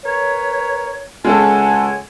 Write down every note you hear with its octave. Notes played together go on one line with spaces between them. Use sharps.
A#4 B4 C#5
C#2 G#3 C#4 A4 F#5 G#5